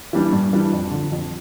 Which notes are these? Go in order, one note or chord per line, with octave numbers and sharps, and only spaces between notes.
E3 G3 D4
G2
E3 G3 D4
F2
D3 F3
F2